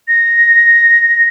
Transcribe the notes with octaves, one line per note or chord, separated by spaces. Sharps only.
A#6